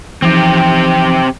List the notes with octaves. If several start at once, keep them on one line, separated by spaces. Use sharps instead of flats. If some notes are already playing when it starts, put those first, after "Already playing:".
E3 F3 C4 D#4 G4